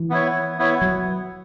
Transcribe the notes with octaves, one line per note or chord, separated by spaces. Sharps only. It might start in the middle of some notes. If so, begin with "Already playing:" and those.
Already playing: E3
B3 E4 C#5
B3 E4 C#5
F#3